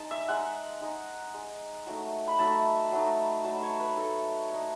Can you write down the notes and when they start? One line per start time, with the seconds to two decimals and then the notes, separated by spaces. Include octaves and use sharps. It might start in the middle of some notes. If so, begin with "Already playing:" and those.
Already playing: G#3 D#4 A5
0.11 E5
0.28 G#3 D#4 F#5
0.81 G#3 D#4
1.34 G#3 D#4
1.87 F#3 A3 D#4
2.28 B5
2.39 F#3 A3 D#4 A5
2.92 F#3 A3 D#4
3.44 F#3 A3 D#4 A5
3.62 C#5
3.80 B4
3.97 A3 D#4 A4
4.50 A3 D#4